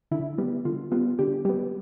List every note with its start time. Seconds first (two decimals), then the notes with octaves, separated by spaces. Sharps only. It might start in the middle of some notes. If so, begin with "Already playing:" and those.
0.11 D3 E4
0.38 G3 B3
0.65 D3 F4
0.92 G3 B3 F4
1.19 D3 G4
1.45 G3 B3 G4